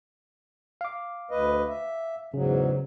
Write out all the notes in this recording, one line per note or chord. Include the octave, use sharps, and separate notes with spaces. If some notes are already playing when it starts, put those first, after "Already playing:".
F5 D6
D2 B4 D#5
E5
E2 G#2 C#3 F#3